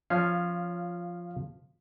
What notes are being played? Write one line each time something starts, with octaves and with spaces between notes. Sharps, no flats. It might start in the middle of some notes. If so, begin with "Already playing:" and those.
F3 C#4 F5